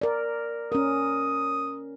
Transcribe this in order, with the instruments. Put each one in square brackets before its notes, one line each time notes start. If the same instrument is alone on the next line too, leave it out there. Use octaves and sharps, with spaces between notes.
[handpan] A#4 D5
[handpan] C#4 A#4 [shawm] D#6